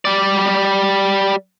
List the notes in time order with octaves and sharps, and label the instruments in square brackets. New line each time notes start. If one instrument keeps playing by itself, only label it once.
[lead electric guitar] G3 D5